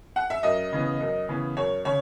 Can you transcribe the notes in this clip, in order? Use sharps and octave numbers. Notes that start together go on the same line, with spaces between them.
F#5
E5
F#2 D#5
C#3 E3 B3
F#2
C#3 E3 B3
F#2 C#5
C#3 C#5